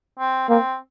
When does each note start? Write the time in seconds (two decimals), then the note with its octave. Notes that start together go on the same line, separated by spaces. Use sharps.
0.19 C4
0.49 A#3 C4